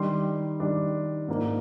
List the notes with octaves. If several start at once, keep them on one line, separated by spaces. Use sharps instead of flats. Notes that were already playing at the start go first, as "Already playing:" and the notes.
Already playing: D#3 G3 D4 C6
D#3 G3 D4
G#2 F3 A#3 D4